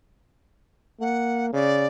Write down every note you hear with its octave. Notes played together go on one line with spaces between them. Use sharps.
A#3 F#5
C#3 D5